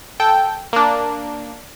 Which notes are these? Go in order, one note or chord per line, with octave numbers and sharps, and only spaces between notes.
A4 G5
A#3 D4